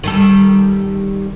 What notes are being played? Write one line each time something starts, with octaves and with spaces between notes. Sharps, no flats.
D#3 G3 A4